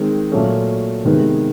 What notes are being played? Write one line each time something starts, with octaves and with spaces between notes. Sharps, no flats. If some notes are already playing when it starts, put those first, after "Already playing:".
Already playing: D#3 G#3 C4
A#2 F#3 A3 C#4
C3 D#3 G#3 B3